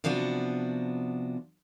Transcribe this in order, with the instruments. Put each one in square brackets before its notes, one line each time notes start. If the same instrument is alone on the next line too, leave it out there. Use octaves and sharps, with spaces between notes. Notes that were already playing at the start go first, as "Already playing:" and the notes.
[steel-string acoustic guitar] C3 F3 B3 D4 F#4